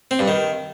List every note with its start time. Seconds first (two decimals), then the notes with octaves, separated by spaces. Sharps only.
0.11 C4
0.19 G2
0.28 D#3